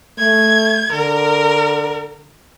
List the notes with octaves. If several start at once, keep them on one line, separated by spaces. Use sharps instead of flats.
A3 G#6
D3 A#4